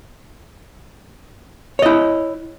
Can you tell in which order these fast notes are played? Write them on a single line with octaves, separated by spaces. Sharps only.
C#5 D#5 E4